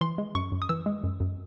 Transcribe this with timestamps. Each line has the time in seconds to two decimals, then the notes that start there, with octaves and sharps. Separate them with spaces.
0.01 E3 C6
0.18 G#3
0.35 F#2 C#6
0.52 F#2
0.62 D#6
0.69 E3 E6
0.86 G#3
1.04 F#2
1.20 F#2